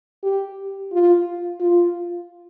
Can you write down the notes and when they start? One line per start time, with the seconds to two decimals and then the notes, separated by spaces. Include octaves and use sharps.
0.23 G4
0.92 F4
1.60 F4